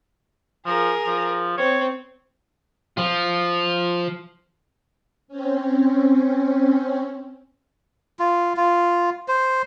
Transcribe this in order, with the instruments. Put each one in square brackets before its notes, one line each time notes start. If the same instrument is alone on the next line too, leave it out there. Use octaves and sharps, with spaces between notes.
[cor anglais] F3 [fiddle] G#4 A#4
[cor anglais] F3
[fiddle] C4 [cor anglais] C#5
[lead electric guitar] F3 F4
[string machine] C4 C#4
[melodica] F4
F4
C5